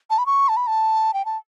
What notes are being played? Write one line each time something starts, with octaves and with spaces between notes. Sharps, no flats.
A5
B5
C#6
A5
B5
A5
G5
A5